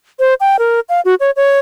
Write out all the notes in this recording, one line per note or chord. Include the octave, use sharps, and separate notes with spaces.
C5
G5
A#4
F5
F#4
C#5
C#5